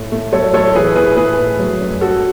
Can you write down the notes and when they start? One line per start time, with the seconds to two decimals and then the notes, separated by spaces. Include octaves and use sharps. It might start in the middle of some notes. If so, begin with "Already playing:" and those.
Already playing: A2
0.12 A3
0.32 F#3 A4 C#5
0.54 A2 A4 C#5
0.74 E3 G#4 B4
0.96 A2 G#4 B4
1.17 A2 G#4 B4
1.38 A3
1.59 F#3
1.81 F#2
2.01 F#2 F#4 A4